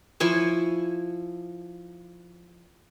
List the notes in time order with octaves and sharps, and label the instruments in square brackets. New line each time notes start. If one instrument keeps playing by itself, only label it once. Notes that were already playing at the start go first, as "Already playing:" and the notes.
[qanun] F3 E4 G#5 C#6